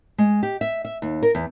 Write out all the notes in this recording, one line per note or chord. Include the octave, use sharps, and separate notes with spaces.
G#3
G4
E5
E5
D#2
A#4
E2